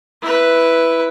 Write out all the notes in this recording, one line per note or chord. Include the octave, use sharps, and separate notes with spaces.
E4 B4